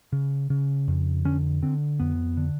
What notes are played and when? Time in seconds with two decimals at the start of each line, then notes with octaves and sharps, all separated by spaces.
0.12 C#3
0.50 C#3
0.88 F2
1.25 D3 C#4
1.62 D3 C4
2.00 F2 B3
2.37 D3